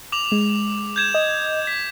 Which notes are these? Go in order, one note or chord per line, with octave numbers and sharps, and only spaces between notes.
D6 F7 F#7
G#3
G6 G#6 E7
D#5
B6